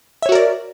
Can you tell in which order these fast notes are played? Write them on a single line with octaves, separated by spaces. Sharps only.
E5 C#5 F#4 A#4 D5